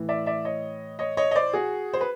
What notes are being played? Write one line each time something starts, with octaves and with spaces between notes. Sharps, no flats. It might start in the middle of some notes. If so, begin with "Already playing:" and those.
Already playing: A2 E3
D5 E5
D5 E5
C#5 D#5
C#5 D#5
C#5 D#5
D#5
C5 D5
F#4 G#4
C5
B4